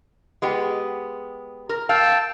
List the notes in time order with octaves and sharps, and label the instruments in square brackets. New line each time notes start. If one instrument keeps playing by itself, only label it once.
[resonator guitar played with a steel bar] G#3 B3 G4
A#4
[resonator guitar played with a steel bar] F5 [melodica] G5 A5 E6